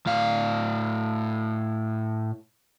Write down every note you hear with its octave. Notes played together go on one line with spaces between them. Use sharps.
A2 F5